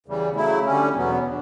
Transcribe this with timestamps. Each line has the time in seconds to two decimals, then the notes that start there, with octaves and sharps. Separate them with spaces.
0.06 E2 C#3 G3
0.36 C#3 F#3 A3 E4
0.65 D3 G3 C#4
0.95 E2 B2 F#3 B3
1.25 D3